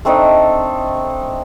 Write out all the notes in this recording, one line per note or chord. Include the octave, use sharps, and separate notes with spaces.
A3 C4 D4 D#4